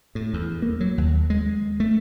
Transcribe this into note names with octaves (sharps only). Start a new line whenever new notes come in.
A2
E2
A#3
F#3
D#2
G#3
A3